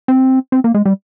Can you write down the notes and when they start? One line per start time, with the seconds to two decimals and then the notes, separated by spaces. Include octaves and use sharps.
0.08 C4
0.52 C4
0.64 A#3
0.75 G#3
0.86 G3